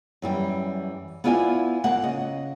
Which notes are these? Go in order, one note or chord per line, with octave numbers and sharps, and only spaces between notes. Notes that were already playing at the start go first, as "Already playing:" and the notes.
F#2 E3 G3
B3 E4 F4 D5 F5 G#5
D2 A#3 F#5
C#3 D#5